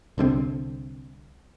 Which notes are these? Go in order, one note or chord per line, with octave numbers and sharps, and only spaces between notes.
C2 D3 G3 C4